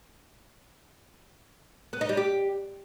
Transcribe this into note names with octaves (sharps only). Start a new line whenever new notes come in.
B3
D#4
G3
G4